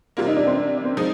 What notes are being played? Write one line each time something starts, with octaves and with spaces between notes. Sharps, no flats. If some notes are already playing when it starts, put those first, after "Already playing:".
C3 G3 A#3 F4
D#4
D4
C4
D4
D4
C4
F3 G#3 D#4